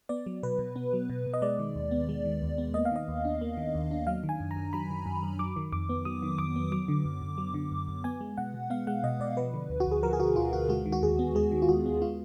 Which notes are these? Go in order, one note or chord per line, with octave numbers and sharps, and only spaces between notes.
B3 D5
F#3
B2 B4
B2
B3
F#3
B2
B2
D#5
G#3 D5
D#3
D#2
B3
G#3
D#3
D#2
B3
A#3 D#5
F5
D#3 D#5
D#2
D4
A#3
D#3
D#2
D4
F#3 F5
D#3
G#5
F#2
A#5
F#2
F#3 B5
D#3
F#2
F#2
F#3 D6
D#3
F2 D6
B3
F#3 D#6
D#3
F2 D6
B3
F#3 D6
D3
F#2
F#2
F#3
D3
F#2
F#2
B3 G#5
G#3
B2 F#5
B2
B3 F5
G#3 F#5
B2 D#5
B2 D5
F3 B4
D3
D2
F#4
D2 G#4
F3 A#4
G#4
D3 F#4
D2 F4
D2 F#4
G#3 F#4
D#3
F#4
D#2 G#4
B3
G#3 G#4
D#3
F4
D#2 F#4
B3
G#3 F4